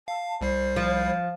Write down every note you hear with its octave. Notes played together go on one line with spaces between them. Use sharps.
F5 A5
C2 G3 C5 C7
F3